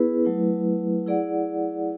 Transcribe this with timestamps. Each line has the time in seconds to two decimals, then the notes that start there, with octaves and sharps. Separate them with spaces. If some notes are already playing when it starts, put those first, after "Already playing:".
Already playing: B3 E4 G#4 B4
0.24 F#3 A3 E4 B4
1.06 E4 G#4 D5 F#5